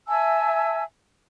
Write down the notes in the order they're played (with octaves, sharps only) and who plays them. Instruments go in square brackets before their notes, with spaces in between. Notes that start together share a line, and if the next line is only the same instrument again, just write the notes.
[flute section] E5 G#5 A5 E6